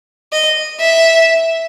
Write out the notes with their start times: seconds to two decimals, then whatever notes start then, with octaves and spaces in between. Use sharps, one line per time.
0.33 D#5
0.80 E5